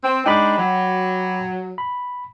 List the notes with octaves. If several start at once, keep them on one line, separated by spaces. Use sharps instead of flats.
C4
G#3 D4 D#4 G5 B5 D6
F#3
B5